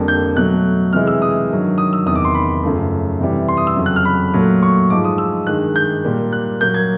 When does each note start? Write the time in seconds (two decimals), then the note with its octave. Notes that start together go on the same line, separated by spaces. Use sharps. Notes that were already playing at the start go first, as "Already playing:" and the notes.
Already playing: F2 D3 G3 A#3
0.08 G6
0.35 B2 F#3 A3 F#6
0.93 C3 E3 G#3 F6
1.07 E6
1.22 D#6
1.50 G2 D#3 F#3
1.78 D#6
1.93 E6
2.06 E2 C3 D#3 D#6
2.15 D6
2.25 C6
2.35 B5
2.63 F#2 C#3 F3 A3
3.20 C3 E3 G3
3.48 C6
3.57 D#6
3.67 E6
3.76 F2 C#3 F#3
3.86 F#6
3.96 F6
4.05 B5
4.34 A#2 F#3 A3
4.63 C#6
4.90 G#2 F3 G#3 D6
5.04 D#6
5.18 E6
5.47 G2 D#3 G#3 F#6
5.76 G6
6.05 A#2 G3 A#3
6.33 F#6
6.61 A#2 F#3 A#3 G6
6.74 G#6